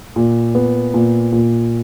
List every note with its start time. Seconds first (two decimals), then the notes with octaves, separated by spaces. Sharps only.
0.16 A#2
0.55 B3
0.94 A#2
1.32 A#2